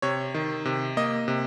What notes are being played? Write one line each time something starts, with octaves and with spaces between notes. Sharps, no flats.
C3 C#5
D#3
C3
A#3 D#5
C3